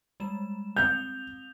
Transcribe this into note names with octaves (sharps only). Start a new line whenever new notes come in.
G3 G#3 E7
C4 G6 F7